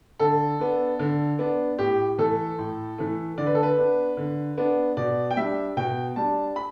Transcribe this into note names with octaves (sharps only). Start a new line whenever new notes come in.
D3 A4
B3 D4
D3
B3 D4
A2 G4
E3 A3 A4
A2
E3 A3
D3 D5
B4
A4
B4
B3 D4
D3
B3 D4
B2 D5
G5
G3 D4 E5
B2 G5
G3 D4 A5
B5